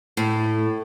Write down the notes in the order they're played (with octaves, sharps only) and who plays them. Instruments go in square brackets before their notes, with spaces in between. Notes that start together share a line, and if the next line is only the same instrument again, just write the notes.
[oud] A2